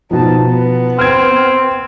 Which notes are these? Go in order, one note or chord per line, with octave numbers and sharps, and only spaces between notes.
B2 F3 D#4 A5
B3
C4 F6 G#6